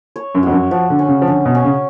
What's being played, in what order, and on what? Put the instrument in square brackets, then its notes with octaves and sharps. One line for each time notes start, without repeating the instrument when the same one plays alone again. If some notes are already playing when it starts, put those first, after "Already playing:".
[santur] C#5
[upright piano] F#2
[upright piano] F2 [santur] F#4
[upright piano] F#2
[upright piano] F3 [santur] F#4
[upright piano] D3
[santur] C#4
[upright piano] C#3
F3
[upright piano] D3 [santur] C#4
[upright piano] B2
[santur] C#4
[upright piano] C#3